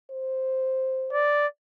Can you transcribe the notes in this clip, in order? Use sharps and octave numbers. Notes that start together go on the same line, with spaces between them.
C5
D5